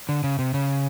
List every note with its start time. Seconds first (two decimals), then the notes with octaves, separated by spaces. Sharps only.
0.09 D3
0.24 C#3
0.39 C3
0.54 C#3